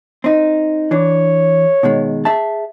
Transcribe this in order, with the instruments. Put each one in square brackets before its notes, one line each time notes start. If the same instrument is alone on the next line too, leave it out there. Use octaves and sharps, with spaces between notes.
[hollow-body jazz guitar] C4 D#4
[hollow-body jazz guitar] E3 D4 [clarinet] C#5
[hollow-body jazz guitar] B2 D#3 G#3
G#4 E5 A5